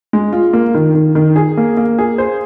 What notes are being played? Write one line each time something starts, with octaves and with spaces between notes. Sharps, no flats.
G#3
F4
A#3
D#3
D#3
D#3
G#4
A#3
A#3
G#4
C5